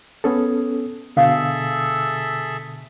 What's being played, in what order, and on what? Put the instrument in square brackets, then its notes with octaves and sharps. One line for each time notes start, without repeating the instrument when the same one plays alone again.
[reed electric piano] B3 C#4 A4 [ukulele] G#4
[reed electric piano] B2 D3 [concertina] G#4 A4 E5 [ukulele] F5